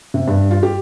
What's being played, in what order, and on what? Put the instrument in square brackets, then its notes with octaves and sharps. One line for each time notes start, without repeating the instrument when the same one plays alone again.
[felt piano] C3
G2
F4
G4